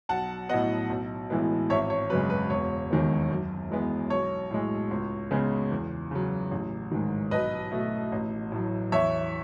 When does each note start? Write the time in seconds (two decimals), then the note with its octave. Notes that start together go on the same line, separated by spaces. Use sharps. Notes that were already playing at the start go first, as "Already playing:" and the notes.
0.09 B1 F#5 A5
0.49 A2 F#3 B3 D#5 F#5
0.90 B1
1.30 A2 E3 G#3 B3
1.70 G#1 C#5 E5
1.90 C#5
2.10 F#2 C#3 G#3 B4
2.30 B4
2.50 E1 C#5
2.90 D#2 D#3 G#3 B3
3.30 F#2
3.70 E3 G#3 B3
4.10 B1 C#5
4.51 A2 G#3
4.91 C#2
5.31 C#3 G#3 B3
5.71 E2
6.11 C#3 F#3
6.51 A1
6.91 G#2 D#3
7.31 B1 B4 D#5
7.71 B2 A3
8.12 A1
8.52 A2 F#3
8.92 E2 C#5 E5